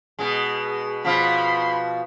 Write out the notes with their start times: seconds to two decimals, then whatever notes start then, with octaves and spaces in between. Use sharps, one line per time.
0.19 B2 G#3
1.05 B2 F3 B5 C6